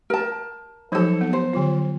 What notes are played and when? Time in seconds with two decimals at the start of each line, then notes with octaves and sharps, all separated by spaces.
0.10 A#4 A5
0.92 F3 F#3 D#4 A4 C5
1.21 B3
1.33 C5
1.53 D3 F#3 F4